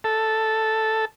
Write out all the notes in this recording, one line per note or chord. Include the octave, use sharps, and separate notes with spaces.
A4